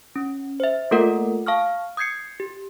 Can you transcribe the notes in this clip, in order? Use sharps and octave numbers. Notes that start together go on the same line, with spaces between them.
C#4
C5 E5
A3 A#3 F4 A4 A#4 F#5
F5 A5 C#6 D#6 F6
D#6 G6 G#6 C7 C#7
G4